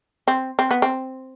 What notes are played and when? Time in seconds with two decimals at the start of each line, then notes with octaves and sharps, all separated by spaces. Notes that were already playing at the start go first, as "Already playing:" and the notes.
0.28 C4
0.59 C4
0.71 B3
0.82 C4